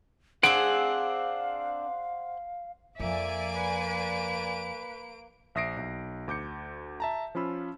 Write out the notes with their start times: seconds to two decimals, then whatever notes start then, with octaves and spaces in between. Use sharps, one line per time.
0.43 C4 D4 G#4 C5 F5 F#5 D7
3.00 F2 F3 A#3 D5 E5 G#5 D7
3.60 B4
5.55 A#1 E5 D#6 A#6 C7 D7
5.77 B1
6.28 D2 D6 G6 C#7
7.00 E5 A5 A#5
7.35 F3 C#4 F4 B5 E6